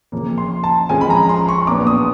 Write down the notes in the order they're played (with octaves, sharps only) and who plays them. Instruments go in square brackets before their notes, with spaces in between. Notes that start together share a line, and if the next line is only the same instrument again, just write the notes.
[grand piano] C#3 F3 A#3
C6
A5
F3 G#3 C#4 G#5
B5
A#5
C6
C#6
A#2 F#3 B3 D4 D6
D#6